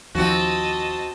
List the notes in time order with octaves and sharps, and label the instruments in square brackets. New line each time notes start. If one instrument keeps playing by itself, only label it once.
[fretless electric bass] D#2 F3 [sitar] C4 F#4 [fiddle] D#5 A5